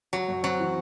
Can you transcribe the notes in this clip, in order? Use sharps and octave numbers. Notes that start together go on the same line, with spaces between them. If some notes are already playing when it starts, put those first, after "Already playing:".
F#3 F#4
F#2
F#3 C4
E3